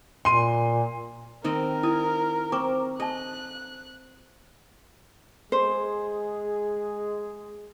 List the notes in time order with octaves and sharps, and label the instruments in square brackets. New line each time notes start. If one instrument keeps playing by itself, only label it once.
[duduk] A#2 [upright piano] C6 D#7
[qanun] D#3 C4 D#5 [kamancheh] A#4
[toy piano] E4 D#6 [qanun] G#5
[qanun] C4 [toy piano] A#5 C#6 D6
[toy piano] A4 A5 [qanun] D#5 [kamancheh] F#6
[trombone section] G#3 G#4 [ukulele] C5